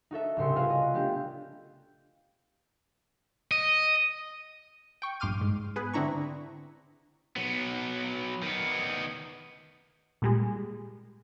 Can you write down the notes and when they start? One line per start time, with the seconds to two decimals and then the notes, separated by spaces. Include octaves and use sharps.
0.11 D#4 F#4 A4 E5
0.37 C2 A2 C#3 C6 C#7
0.56 F4 F#4 A4 B4 F5 G#5
0.70 D#5
0.94 A3 B3 D4 G4
3.51 D#5
5.02 G5 C#6
5.20 A#1 G2 C6 D6 F6 D#7
5.41 G#2
5.76 B3 G#4 B4
5.93 D3 C4 D4 E4 A#5 C#6
7.36 F#3 B3
8.42 D#3 B3
10.22 A#2 G3 G#3